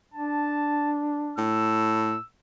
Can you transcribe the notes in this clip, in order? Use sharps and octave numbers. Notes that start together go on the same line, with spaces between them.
D4 A5
A2 E6